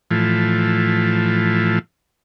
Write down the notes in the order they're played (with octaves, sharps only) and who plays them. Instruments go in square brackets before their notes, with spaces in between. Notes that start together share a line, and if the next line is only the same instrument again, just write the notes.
[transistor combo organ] A2 E3 F3